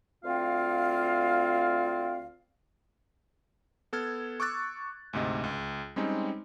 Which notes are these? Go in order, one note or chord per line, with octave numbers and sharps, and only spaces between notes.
D2 C4 F4 F5
B3 A4 F6 G#6
C#6 D6 E6 F#6 A6
D2 G#2 C3 D#5
C#2
G3 G#3 C4 C#4 D#4